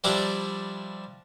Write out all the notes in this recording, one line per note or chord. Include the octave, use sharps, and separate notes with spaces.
F3 G3 D4 E4 A#5 D6